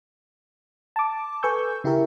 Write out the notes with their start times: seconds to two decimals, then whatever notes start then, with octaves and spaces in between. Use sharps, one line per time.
0.96 A5 D6
1.43 A4 B4 G#5 C#6 E6 G6
1.84 C#3 E4 G4 A#4 E5